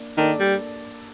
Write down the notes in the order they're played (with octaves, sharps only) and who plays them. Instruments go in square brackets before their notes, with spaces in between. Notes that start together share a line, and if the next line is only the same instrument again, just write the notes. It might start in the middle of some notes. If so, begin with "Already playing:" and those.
Already playing: [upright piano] A#3 D4
[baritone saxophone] D#3 [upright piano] A#3 D4 A4 D5
[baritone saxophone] G3